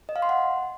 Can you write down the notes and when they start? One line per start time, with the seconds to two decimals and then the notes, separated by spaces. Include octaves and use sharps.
0.09 D#5
0.16 F5
0.22 C6
0.29 F#5